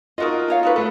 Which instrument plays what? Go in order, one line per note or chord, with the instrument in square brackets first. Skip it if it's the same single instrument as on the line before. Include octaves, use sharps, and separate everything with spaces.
[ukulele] D#4 F#4 D#5 [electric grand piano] F4 A#4
[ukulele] D#4 C#5 F5
D#4 F#4 B4
[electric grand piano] A3 A4 [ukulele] B4